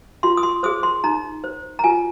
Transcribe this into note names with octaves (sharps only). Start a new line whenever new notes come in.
F4 C6
D#6
C6
G#4 C5 D#6
C6
D#4 A#5
C5
A#5
F4 G#5